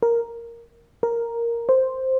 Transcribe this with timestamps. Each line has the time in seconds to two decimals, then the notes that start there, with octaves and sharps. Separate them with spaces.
0.03 A#4
1.03 A#4
1.69 C5